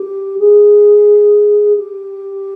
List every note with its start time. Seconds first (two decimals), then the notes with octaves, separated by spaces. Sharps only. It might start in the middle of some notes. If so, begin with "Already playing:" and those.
Already playing: G4
0.38 G#4
1.76 G4